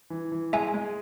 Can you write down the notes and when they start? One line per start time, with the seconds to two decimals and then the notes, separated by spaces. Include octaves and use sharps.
0.10 E3
0.32 E3
0.53 G#3 E5 G#5
0.74 G#3